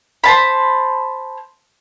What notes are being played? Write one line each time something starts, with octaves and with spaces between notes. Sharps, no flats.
C5 A5 B5